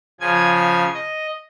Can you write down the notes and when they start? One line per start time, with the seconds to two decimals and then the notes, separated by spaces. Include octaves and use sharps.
0.20 C#3 F3 G#5 G#6
0.94 D#5